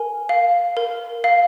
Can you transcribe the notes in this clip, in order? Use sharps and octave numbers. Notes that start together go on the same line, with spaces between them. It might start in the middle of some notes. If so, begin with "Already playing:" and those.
Already playing: A#4 G#5
F5
A#4
F5